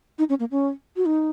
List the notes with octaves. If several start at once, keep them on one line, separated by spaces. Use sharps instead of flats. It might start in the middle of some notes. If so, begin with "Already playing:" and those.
D#4
C#4
A#3
C#4
F#4
D#4